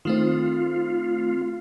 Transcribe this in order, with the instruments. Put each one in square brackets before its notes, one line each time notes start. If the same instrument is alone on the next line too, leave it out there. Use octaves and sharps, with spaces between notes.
[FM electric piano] D#3 A3 C4 [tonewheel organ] F4